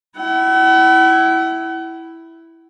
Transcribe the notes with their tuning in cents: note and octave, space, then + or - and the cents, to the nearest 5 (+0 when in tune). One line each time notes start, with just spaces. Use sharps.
E4 +0 F#5 +40